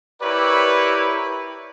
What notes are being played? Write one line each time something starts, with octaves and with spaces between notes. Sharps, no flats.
E4 G4 A#4 B4 C#5 D5